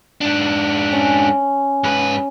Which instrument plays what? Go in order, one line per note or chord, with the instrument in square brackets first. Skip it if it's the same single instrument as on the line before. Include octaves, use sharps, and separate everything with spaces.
[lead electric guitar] G#2 D4
[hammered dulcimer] C#4
[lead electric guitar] G#2 B4